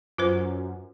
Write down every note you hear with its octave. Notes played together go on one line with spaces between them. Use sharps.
F#2 F4 B4 C5